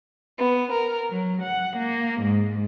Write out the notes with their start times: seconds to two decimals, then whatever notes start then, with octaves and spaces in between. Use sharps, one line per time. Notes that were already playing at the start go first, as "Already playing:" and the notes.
0.39 B3
0.73 A#4
1.12 F#3
1.43 F#5
1.80 A#3
2.22 G#2